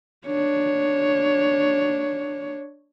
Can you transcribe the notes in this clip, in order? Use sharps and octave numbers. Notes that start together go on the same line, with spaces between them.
D4 C#5